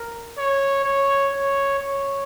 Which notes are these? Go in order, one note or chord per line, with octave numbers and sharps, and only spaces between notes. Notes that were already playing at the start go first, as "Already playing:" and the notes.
Already playing: A#4
C#5
C#5
C#5
C#5